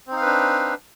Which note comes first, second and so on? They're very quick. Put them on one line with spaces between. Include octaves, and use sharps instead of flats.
C4 D#4 F5 B4 D4